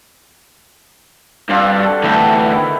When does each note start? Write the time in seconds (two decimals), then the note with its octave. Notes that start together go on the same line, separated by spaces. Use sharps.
1.49 G2 C4 D4 F4
1.78 F#4 A4
2.04 D2 E3 B4 G5 A5
2.49 D#3 E4